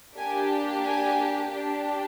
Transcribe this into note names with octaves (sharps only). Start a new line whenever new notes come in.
A#3 D4 G4 G#5
G#5
D4 G4